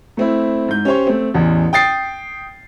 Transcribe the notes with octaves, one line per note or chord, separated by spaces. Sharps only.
A3 C4 E4
G#2 G6
C#4 G4 C5 C#5
A3 C4
A1 E2
G5 D#6 A6 C7